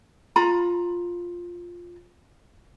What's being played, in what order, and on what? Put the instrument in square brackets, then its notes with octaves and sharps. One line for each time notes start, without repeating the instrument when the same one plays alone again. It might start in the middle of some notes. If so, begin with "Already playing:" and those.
[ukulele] F4 A#5 B5